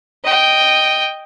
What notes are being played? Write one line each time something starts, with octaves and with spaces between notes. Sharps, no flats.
D#5 G5